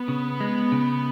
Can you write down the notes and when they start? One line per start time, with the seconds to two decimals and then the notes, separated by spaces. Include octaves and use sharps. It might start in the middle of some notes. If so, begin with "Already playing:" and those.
Already playing: B3
0.08 C#3
0.40 G#3
0.72 C#3